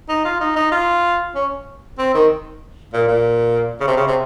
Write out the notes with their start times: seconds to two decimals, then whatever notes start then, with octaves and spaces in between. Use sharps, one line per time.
0.09 D#4
0.25 F4
0.40 D#4
0.56 D#4
0.72 F4
1.35 C#4
1.98 C4
2.14 D#3
2.93 A#2
3.08 A#2
3.80 C#3
3.87 C3
3.97 C#3
4.07 C3